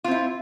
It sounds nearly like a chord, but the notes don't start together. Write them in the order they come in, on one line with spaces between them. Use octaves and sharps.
F4 C4 E4